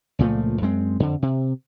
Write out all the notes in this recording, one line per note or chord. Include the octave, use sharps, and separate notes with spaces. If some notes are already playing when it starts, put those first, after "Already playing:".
C#2 A#2 F3 A3
F#2 G#3 C4
F2 D3
C3